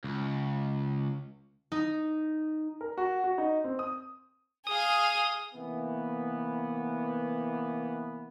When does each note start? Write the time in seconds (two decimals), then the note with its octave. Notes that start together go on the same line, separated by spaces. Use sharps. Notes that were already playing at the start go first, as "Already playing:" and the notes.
0.04 C#2
1.72 D#4
2.81 A#4
2.98 F#4
3.24 F#4
3.38 D#4
3.64 C4
3.79 D#6
4.67 G#4 F5 D#6
5.54 C3 E3 A#3 B3